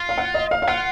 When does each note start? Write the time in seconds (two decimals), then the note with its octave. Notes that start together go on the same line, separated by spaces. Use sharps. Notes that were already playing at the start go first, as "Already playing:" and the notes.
Already playing: F4
0.09 F5
0.18 F#5
0.34 D#5
0.51 F5
0.62 F5
0.68 F4 F#5